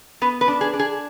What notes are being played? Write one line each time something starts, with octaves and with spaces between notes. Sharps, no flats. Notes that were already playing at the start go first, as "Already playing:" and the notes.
B3 B4
B4
D4
G#4
D4
G#4